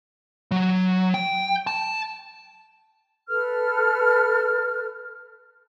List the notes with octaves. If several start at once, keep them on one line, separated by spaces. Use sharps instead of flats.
F#3
G5
A5
A4 B4 F6